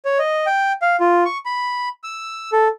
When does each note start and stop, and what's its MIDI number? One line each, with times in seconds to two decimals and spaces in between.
0.05 0.18 73
0.19 0.46 75
0.47 0.72 79
0.82 0.96 77
1.00 1.24 65
1.25 1.38 85
1.46 1.89 83
2.04 2.50 88
2.52 2.68 69